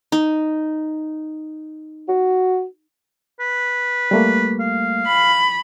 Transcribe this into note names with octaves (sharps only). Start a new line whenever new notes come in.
D#4
F#4
B4
G3 A3 A#3
F5
B5